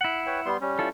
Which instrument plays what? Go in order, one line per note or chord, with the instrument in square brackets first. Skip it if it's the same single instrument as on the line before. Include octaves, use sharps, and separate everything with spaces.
[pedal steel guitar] E4 F#5
[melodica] B4 C#5 G5
G3 B3 C6
G3 C#4
[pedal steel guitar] E4 F4 A4